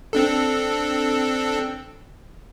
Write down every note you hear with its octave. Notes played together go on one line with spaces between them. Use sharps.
C4 D4 A4